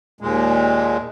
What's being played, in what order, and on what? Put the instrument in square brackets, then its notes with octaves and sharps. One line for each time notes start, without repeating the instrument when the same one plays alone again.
[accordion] D#2 A#2 G#3